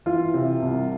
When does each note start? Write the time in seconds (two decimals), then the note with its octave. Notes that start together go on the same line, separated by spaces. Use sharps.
0.06 E3 F4
0.34 C3
0.62 C2